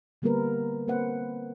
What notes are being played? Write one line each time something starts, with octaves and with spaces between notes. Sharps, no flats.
D3 G3 A#3 B3 A#4 B4
A#3 C4 B4 C5 F#5